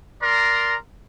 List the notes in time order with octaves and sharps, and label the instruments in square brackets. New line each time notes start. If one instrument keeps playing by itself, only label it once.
[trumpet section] A#4 D5 A#5 C6